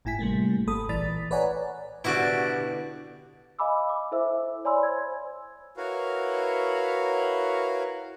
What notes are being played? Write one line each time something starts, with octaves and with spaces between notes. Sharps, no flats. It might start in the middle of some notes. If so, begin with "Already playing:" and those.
G#1 A2 E4 G#5 B6
C3 G3 A3 A#3
G#1 A4 B5 D#6
B1 A#2 E3 D5 A6 B6
B4 C#5 D5 F#5 G#5 A#5
B2 D3 E4 F#4 G4 D5
D#5 F5 G#5 B5 D6 E6
D6
E4 A4 C5 E5 E6
C#5 D5 G#5 B5 C6 E6
C5 G#6
E4 F#4 A#4 B4 C#5 F5